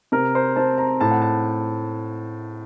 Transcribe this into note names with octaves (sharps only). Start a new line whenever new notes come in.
C3 A#4
C5
C4 A5
A#5
A2 A5
F#5
A5